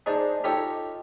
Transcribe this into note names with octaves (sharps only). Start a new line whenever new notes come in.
D4 D#4 G#4 C5 D5 A5
D#4 F4 G4 A4 C#5